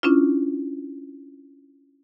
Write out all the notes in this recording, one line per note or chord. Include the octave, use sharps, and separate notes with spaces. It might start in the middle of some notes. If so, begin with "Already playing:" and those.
C#4 D4 E4 F4